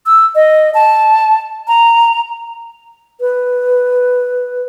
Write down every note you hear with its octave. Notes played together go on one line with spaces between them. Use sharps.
E6
D#5
A5
A#5
B4